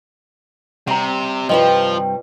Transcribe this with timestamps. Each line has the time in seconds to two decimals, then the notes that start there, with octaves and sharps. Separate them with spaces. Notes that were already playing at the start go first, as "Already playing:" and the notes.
0.87 C3 G3 F#5 A#5
1.49 G2 C3 F3 G3 F4 D#5